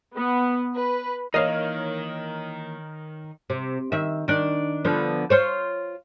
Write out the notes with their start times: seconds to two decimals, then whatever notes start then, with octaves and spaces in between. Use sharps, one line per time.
0.16 B3
0.75 B4
1.34 D#3 E3 A#3 D#4 A#4 C#5 D#5 F5
3.50 C3
3.92 D#3 E5
4.28 D#3 D4
4.85 D3 F3 B3
5.30 F4 C5 C#5